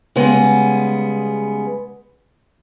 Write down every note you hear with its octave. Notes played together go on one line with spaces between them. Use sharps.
C#3 G3 G#3 B3